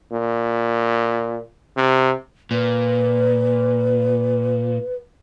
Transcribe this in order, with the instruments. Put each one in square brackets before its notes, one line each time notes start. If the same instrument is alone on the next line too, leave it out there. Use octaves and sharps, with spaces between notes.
[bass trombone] A#2
[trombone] C3
[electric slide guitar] A#2 [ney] B4